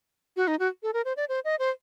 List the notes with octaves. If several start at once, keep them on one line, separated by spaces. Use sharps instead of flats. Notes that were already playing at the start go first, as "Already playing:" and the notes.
F#4
D#4
F#4
A4
A#4
C5
D5
C5
D#5
C5